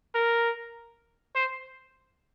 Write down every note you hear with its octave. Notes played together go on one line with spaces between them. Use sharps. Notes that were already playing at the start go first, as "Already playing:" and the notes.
A#4
C5